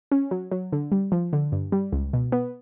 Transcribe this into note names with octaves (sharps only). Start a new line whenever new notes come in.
C#4
F#3
F#3
D3
G3
F3
D3
G2
G3
C#2
B2
B3